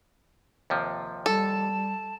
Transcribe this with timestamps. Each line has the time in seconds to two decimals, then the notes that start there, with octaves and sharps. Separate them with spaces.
0.70 D#2 C3 F3
1.26 G3 A4 A5